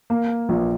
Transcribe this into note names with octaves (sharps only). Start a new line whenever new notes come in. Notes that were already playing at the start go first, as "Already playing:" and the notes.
A#3
A#1